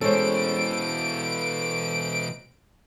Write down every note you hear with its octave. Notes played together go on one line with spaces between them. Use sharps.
B2 E3 G#3 C#4 A4 C5 D7